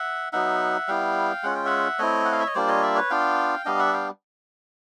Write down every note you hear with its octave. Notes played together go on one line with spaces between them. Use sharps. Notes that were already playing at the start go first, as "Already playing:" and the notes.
Already playing: E5 F#5
F#3 B3 D#4 E5 F#5
G3 B3 E4 F5 G5
G#3 C#4 F4 F#5
G5
E5 F#5
A3 C4 E4 C#5 D#5
F#5
F5
E5
D#5
G3 A#3 D4 F4 C5 D5
C#5 D#5
D5 E5
B4 C#5
B3 D4 F4 F5 G5
G3 B3 D4 D#5 F5
E5 F#5
F5 G5